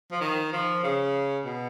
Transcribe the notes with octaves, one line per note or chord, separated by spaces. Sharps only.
F3
D#3
F3
C#3
B2